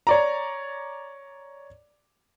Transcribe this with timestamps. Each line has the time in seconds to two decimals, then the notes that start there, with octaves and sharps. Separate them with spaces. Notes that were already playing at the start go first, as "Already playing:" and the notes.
0.07 C#5 D5 A#5